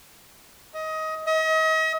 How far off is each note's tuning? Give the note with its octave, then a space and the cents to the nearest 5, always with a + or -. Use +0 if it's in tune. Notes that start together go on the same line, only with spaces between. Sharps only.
D#5 +20
D#5 +40